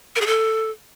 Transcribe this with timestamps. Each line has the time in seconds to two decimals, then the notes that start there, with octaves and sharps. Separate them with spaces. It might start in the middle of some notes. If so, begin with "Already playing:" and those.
0.16 A#4
0.21 G#4
0.27 A4